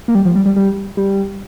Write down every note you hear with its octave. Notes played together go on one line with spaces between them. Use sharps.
A#3
G3
F3
G3
G3
G3
G3